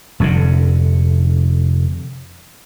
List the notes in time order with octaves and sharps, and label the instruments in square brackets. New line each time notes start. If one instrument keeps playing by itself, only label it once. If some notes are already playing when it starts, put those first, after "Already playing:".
[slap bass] F1 F2 A#2 D3